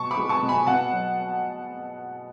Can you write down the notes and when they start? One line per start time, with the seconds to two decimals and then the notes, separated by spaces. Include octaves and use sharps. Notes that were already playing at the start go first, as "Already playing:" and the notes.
Already playing: B2 A5 C#6
0.11 B5 D6
0.17 G#3
0.29 A5 C#6
0.42 B2
0.48 G#5 B5
0.67 B2 F#5 A5
0.92 F#3